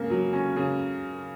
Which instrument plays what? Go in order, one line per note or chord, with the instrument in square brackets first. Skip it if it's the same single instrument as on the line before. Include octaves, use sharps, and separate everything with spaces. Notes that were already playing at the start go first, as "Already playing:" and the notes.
Already playing: [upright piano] C#3 A#3
F#3
C#4
C#3